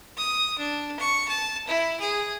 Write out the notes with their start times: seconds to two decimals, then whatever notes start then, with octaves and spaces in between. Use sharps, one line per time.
0.17 D#6
0.59 D4
1.00 C#6
1.28 A5
1.68 E4
2.00 G#4